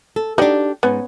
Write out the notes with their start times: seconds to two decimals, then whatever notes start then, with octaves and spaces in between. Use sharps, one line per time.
0.16 A4
0.38 D4 D#4 F#4 G4 D5
0.83 G#2 B3 C#4